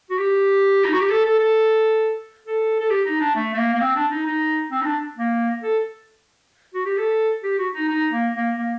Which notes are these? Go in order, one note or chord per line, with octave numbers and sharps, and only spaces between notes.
F#4
G4
D#4
F#4
G4
A4
A4
A4
A4
A4
G4
D#4
D4
A3
A3
A#3
A#3
C4
D4
D#4
D#4
C4
D#4
D4
A#3
A4
F#4
G4
A4
G4
F#4
D#4
D#4
A#3
A#3
A#3